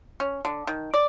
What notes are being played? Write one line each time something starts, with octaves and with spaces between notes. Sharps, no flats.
C#4
D3
D#3
D5